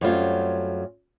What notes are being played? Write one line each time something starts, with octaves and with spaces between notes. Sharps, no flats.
F#2 F#3 G3 A3 C4 F4